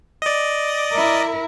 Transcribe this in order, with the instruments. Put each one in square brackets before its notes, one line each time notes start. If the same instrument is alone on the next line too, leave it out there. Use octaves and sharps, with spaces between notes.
[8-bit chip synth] D5 D#5
[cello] E4 A#4